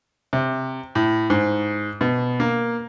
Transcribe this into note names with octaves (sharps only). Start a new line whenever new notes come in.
C3
A2
G#2
B2
A#3